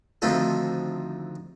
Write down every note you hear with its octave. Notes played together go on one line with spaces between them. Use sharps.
D2 C3 D#3 F3 A4